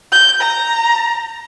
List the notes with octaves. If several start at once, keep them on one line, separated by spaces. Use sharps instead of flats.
G6
A#5